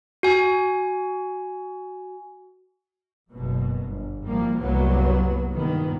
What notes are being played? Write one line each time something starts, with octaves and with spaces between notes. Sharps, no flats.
F#4 G#5
F#1 F#2 B2
G1
G#1 F3 G3 A#3
C2 F#2 F#3 A#3 B3
C2 G2 A#2 D#3 B3